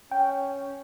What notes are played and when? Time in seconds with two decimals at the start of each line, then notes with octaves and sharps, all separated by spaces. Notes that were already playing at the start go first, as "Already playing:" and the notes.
0.11 C#4 G5